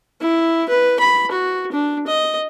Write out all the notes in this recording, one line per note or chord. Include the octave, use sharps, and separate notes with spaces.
E4
B4
B5
F#4
D4
D#5